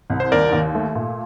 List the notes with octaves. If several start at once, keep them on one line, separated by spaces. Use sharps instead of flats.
C2
C5
D#2 A#4 D5
D#2
A3
A#2